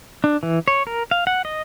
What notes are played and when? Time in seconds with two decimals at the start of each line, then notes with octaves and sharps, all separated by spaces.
0.24 D4
0.43 E3
0.68 C#5
0.87 A#4
1.11 F5
1.27 F#5
1.45 D#5